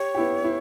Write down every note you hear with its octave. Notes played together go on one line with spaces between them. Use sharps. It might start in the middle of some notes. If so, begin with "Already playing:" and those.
Already playing: G4 C#5
B3 E4 G4
B3 E4